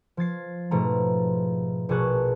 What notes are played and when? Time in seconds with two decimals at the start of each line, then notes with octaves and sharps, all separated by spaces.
0.17 F3 G#6 A6 C7
0.71 G#2 B2 F3 A3 A#5
1.89 A#1 B2 G#4 A5 C#6 F#6